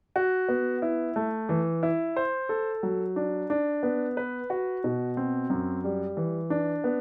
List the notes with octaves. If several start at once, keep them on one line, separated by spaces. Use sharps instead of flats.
F#4
B3
E4
A3
E3
E4
C5
A4
F#3
D4
D4
B3
B4
F#4
B2
C4
F#2
G3
E3
D4
B3